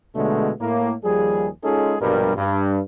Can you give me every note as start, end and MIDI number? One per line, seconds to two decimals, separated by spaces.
0.16 0.52 34
0.16 0.52 47
0.16 0.52 50
0.16 0.52 56
0.16 0.52 57
0.61 0.94 45
0.61 0.94 58
1.04 1.48 39
1.04 1.48 53
1.04 1.48 55
1.04 1.48 68
1.64 1.96 56
1.64 1.96 61
1.64 1.96 63
1.64 1.96 65
1.64 1.96 68
1.64 1.96 69
2.01 2.38 34
2.01 2.38 43
2.01 2.38 47
2.01 2.38 54
2.01 2.38 55
2.01 2.38 70
2.38 2.80 43